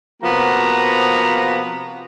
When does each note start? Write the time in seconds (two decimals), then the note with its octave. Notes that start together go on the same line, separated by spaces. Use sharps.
0.23 C3 F3 A#3 B3 F#4 A#5